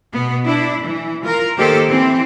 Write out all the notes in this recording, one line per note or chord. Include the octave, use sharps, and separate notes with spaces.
B2 B3
D4 E4
E3
F4 A#4
D#3 A#3 G4 A4 C5
E3 C4